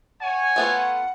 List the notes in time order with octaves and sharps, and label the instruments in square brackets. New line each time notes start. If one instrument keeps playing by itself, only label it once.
[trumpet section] C#5 G#5 [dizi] F#5
[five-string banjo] A3 B3 F4